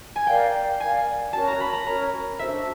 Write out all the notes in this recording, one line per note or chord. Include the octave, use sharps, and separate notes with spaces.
G#5
A#4 D5 F5 G5
A#4 D5 F5 G#5
C#4 F#4 A#4 C#5 A5
A#5
B5
A#5
C#4 F#4 A#4 C#5 A#5
D4 F#4 A4 C5 E5